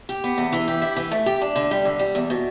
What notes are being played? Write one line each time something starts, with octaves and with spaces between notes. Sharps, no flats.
G4
B3
E2
E3
G4
E4
E3
A3
G4
D4
D3
G3
D3
G3
E2
B2